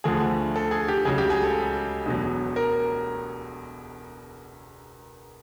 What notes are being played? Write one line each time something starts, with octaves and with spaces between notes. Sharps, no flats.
D2 D3 F3 A3 G#4
A4
G#4
G4
C#2 C#3 F#3 G#4
G4
G#4
A4
E1 E2 B2 F#3
A#4